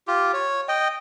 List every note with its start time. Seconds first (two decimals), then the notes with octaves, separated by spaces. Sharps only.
0.07 F4 G4
0.34 C#5
0.68 D#5 G5